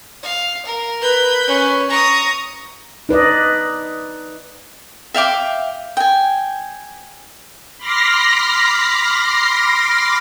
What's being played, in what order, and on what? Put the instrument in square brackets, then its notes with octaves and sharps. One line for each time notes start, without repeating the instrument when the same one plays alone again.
[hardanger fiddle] F5
A#4
[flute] B4 [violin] B5 G6
[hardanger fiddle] C#4
[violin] A#5 D#6 [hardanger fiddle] C#6
[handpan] D#4 B4 D5 D#5
[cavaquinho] E5 F5 G5 D6
G5 G#5
[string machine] B5 C6 D6 F6 A#6 C7